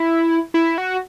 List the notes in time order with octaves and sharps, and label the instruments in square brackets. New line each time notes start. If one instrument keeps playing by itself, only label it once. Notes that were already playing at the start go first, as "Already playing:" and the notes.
Already playing: [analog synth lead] E4
E4
F#4